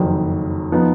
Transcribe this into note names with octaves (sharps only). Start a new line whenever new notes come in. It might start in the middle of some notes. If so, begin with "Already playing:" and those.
Already playing: F#1 F2 D#3 F#3
F3 B3 D#4